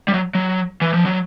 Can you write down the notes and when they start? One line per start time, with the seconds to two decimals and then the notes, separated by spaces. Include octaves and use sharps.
0.08 G3
0.14 F#3
0.35 F#3
0.81 E3
0.94 F3
1.05 F#3